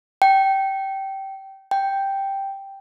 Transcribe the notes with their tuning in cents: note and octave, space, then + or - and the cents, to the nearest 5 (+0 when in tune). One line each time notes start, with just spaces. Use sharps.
G5 -20
G5 +0